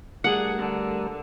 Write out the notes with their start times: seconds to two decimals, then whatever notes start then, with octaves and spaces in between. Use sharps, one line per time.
0.24 G3 A3 D4 G#4 A#4 F#5
0.58 D3